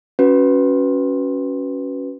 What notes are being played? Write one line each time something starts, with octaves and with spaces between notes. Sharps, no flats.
C#4 F#4 B4